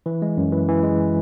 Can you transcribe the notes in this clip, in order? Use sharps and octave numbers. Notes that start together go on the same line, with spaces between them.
E3
G#3
F#2
E3
E3
G#3